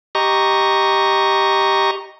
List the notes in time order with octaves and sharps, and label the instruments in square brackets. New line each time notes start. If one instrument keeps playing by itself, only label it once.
[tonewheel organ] G4 D#5 A#5 C#6